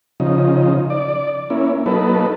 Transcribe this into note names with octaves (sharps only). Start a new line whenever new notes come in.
C#3 F3 D#4
D5
A#3 C#4 E4
F#3 A#3 D#4 A4 B4